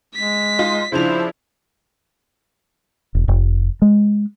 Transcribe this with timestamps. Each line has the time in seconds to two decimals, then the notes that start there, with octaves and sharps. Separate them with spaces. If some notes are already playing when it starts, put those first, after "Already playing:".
0.15 G#3 B6
0.59 D#4 F4 C6
0.92 C#3 F3 D4 E4 C5 F7
3.15 E1
3.28 F1
3.82 G#3